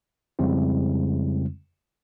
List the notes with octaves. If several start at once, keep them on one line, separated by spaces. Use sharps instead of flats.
F2 C#3 G3 G#3 C4 E4